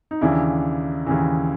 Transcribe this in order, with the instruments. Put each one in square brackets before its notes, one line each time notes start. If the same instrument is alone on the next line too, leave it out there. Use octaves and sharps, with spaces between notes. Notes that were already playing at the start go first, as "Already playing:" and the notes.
[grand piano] D#4
D#2 C#3 E3 D4 E4
D#2 C#3 E3